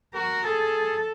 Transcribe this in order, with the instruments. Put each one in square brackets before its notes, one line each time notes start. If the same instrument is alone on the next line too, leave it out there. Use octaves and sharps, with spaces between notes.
[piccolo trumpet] F#4 [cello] A#4
[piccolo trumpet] G#4 [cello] A4